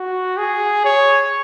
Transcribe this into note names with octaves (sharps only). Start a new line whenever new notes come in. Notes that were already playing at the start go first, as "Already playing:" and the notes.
Already playing: F#4
G#4
C#5